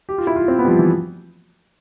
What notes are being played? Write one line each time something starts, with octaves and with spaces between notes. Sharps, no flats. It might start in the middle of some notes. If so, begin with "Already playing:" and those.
G4
F4
E4
F4
C4
B3
G3
F3
E3